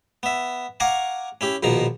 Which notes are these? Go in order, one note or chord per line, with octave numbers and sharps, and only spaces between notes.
B3 E5
F5 F#5 G#5 A#5 C#6 D6
C#4 E4 G4
A#1 B2 D#3 F3 A#5